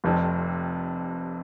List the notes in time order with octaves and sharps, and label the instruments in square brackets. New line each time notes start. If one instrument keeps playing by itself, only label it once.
[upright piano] F1 F2 C3